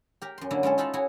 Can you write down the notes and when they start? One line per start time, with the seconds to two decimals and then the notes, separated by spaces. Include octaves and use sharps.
0.22 G4 A#4
0.38 F#2 C6
0.51 D3 F#3 A#3 E4
0.63 G#3 C#4 E4 A4
0.78 D#4 F4 A4 E5 B5
0.94 E4 F#4 G#4 C#5